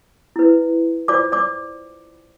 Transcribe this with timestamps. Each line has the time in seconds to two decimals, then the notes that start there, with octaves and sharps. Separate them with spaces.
0.36 E4 B4
1.08 F4 C5 D5 D6
1.32 D5 D6